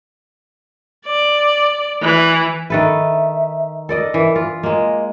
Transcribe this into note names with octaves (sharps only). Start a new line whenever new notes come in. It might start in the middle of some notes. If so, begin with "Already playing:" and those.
D5
E3
D#3 A4 B4 E5
A4 A#4 D5 D#5
E3
F4
G#3 A#3 D#5